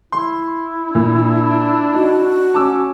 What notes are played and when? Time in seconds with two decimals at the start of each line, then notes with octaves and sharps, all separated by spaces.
0.12 E4 C6
0.95 A#2 D4
1.94 D#4 F#4
2.54 C#4 A5 D6 E6